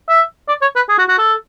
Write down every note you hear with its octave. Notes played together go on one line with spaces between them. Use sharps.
E5
D5
C#5
B4
G#4
F#4
F#4
A4